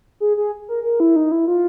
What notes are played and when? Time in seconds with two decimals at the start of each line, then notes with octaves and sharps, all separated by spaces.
0.20 G#4
0.37 G#4
0.68 A#4
0.83 A#4
1.00 E4
1.16 D#4
1.32 E4
1.48 F4